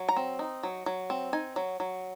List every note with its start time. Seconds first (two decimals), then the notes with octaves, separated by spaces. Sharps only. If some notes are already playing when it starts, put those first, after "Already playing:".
Already playing: F#3
0.09 A#5
0.16 C4
0.39 D#4
0.63 F#3
0.86 F#3
1.10 C4
1.33 D#4 G#5
1.56 F#3
1.80 F#3